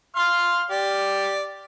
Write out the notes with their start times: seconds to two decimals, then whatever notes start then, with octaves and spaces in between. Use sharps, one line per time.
0.16 F5 C6 F6
0.70 G4 D5